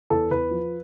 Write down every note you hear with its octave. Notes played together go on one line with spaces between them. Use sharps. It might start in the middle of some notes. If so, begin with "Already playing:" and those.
E2 A4
E2 B4
F3